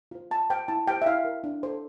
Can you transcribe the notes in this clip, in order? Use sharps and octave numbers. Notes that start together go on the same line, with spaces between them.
F4 C5
F4 A5
C5 G5
E4 A5
G4 C5 G5
E5
E4 F5
A#4
D4
A4 C5